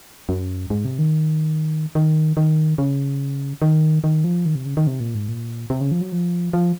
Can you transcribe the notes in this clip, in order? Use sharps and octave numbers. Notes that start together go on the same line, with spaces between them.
F#2
G#2
C3
D#3
D#3
D#3
C#3
D#3
D#3
F3
D#3
C3
C#3
D#3
C3
A#2
G#2
A#2
C3
C#3
F3
F#3
F3
F3